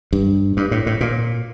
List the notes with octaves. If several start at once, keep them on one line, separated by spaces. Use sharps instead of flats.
G2
G2
A2
A2
A#2